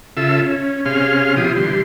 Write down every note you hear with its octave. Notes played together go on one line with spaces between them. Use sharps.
C#3 F4 A4 E5 E6
C#4
C3 C#4 G#4 F5 C6 F6
B2 F3 E4 G4 C6 D#6
D3 E3 G3 C6